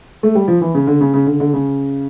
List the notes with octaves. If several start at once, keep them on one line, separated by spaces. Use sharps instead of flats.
A3
G3
F3
E3
C#3
D3
C#3
C#3
D3
D3
C#3